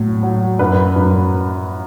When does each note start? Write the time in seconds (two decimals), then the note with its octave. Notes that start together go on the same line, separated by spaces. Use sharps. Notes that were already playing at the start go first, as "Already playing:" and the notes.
Already playing: A2 F#3
0.23 F#3
0.59 F#2 B4
0.96 F#2